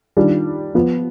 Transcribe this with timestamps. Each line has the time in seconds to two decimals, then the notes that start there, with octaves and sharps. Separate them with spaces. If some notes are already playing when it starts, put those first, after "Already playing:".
0.17 D#3 G3 D4 F4
0.75 F3 B3 F4